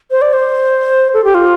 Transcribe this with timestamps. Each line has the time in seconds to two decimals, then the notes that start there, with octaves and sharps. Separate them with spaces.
0.11 C5
0.22 D5
0.33 C5
1.14 A4
1.24 G4
1.35 F4